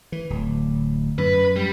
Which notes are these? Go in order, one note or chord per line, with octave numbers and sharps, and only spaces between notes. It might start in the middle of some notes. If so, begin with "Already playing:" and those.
E3
D1
F#2 B4
G3